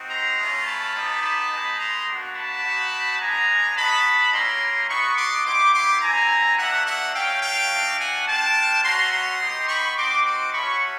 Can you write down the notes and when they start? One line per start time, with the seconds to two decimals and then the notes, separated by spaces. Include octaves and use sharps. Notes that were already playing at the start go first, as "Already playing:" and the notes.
Already playing: C4 D#4 F#4
0.10 A#5 C6
0.38 A3 C#4 F4
0.66 A5 B5
0.95 B3 D#4 G4
1.22 A5 B5
1.51 G#3 B3 D#4
1.79 A#5 C6
2.07 A#3 D4 F#4
2.36 A5 B5
2.64 A#3 D#4 F#4
3.20 G#3 B3 D4 G#5 A#5
3.76 B3 D#4 F#4 A5 B5
4.33 A#3 C#4 E4 G4 A#5 C6
4.89 B3 D#4 F#4 B5 C#6
5.17 C6 D6
5.45 B3 E4 G4 C6 D6
5.74 C6 D6
6.01 C4 E4 G4 G#5 A#5
6.58 A#3 D4 F#4 E5 F#5
6.86 E5 F#5
7.14 A3 C#4 F#4 F5 G5
7.42 F5 G5
7.71 A3 D4 F#4
7.99 F#5 G#5
8.27 A#3 D4 F4 G5 A5
8.83 A3 C#4 F#4 A#5 C6
9.12 A#5 C6
9.41 B3 D#4 G4
9.68 B5 C#6
9.97 C4 D#4 F#4 C6 D6
10.25 C6 D6
10.53 A3 C#4 F#4 B5 C#6